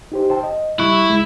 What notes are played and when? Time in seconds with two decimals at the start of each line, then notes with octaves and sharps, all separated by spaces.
0.12 D#4 G4 C5
0.30 C5 G5 A5
0.43 D#5
0.79 G3 E4 C#6 F#6
1.10 C#2 G#3